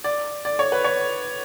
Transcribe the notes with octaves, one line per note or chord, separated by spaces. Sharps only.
D5
D5
C#5
B4
C#5